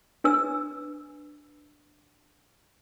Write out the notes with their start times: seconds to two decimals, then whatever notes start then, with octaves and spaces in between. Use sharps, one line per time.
0.24 D4 B4 E6